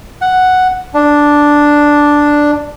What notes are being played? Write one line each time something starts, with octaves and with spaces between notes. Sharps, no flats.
F#5
D4